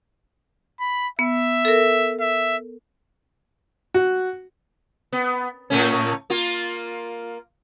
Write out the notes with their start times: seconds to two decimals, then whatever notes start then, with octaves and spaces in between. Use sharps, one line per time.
0.80 B5
1.19 B3 E5
1.65 A4 A#4
2.20 E5
3.94 F#4
5.12 B3
5.70 A2 A3 C#4
6.30 A#3 F4